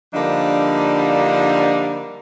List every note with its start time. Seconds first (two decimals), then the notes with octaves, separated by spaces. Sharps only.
0.14 D3 F3 G3 A#3 D4 D#4